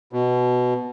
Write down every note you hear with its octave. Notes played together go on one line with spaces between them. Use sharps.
B2